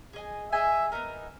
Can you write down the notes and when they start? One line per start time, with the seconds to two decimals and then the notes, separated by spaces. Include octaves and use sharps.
0.13 G#4 D#5 G#5
0.52 G#4 D#5 E5 G#5
0.92 B3 D#4 A#4